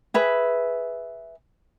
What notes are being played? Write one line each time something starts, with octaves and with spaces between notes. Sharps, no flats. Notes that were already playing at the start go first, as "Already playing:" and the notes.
G#4 B4 E5